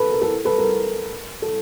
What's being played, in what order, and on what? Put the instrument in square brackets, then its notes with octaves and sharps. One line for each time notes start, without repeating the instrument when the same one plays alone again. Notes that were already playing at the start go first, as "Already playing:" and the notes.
Already playing: [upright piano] A4 B4
A#4
A4 B4
A4 B4
A#4
A4